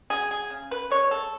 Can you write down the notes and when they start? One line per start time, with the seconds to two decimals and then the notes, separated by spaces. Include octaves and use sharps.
0.10 F#3 G#4
0.31 G#4
0.50 C#3
0.71 B4
0.90 G#3 C#5
1.11 A4